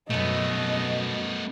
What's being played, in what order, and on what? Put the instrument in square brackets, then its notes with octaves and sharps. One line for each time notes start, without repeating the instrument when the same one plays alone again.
[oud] F#2 B2 [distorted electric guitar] A3 B3 [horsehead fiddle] D#5